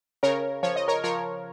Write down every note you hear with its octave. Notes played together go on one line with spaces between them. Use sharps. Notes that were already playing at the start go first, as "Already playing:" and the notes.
C#3 A#4 C#5
F3 C#5
D#5
A#4 C#5
F3 A#4 C#5